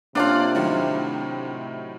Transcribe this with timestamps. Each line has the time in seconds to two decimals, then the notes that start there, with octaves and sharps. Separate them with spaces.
0.15 C3 A#3 C#4 D4 F4 D5
0.55 A2 D#3 F#3